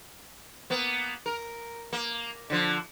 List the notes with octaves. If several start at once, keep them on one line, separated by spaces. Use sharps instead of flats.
A#3 B3
A#4
A#3
D3 F3